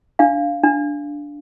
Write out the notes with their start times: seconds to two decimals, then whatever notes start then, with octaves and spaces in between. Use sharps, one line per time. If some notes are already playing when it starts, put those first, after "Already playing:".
0.19 D4 F5
0.64 D4